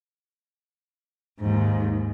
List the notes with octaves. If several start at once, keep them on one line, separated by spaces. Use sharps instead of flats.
D#2 G#2